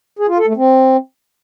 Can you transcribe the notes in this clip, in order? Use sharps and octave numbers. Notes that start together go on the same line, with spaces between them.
G#4
F4
A4
A3
C4